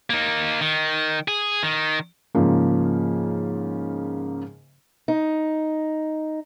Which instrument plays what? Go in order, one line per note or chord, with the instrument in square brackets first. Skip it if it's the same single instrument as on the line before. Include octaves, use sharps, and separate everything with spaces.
[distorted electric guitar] A#3 D#4
D#3
G#4
D#3
[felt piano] G#2 C#3 F3 A#3
[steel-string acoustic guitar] D#4